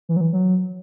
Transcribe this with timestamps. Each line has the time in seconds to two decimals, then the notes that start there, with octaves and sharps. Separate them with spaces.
0.09 E3
0.16 F#3
0.21 E3
0.33 F#3